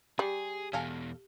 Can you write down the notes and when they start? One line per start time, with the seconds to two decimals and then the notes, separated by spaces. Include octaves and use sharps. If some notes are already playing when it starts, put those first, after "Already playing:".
0.19 G3 G4 G#4 G#5
0.73 E2 B2 A4 F5 G#5